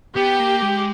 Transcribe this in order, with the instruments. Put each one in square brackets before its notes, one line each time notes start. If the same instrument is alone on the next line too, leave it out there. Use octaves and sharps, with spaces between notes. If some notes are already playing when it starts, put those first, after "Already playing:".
[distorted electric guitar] B3 [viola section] G4
[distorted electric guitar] A#3
G#3